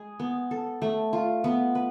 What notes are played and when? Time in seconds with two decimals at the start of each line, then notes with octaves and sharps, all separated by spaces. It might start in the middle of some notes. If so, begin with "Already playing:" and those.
Already playing: G#3 G#4
0.20 B3
0.51 A4
0.82 A3
1.13 F4
1.44 B3
1.75 B4